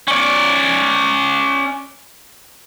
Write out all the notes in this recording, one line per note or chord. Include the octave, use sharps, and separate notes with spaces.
C#4 D5